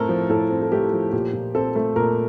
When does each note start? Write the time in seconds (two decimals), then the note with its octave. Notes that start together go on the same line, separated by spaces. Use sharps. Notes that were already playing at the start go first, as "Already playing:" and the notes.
Already playing: A2 A3 C4 A4 A#4
0.09 F3
0.29 A2 A4
0.51 C4
0.62 A4
0.72 A3 G4
0.93 F3
1.13 A#2 G4
1.33 A#2
1.55 C4 A4
1.76 A3
1.96 A#2 A#4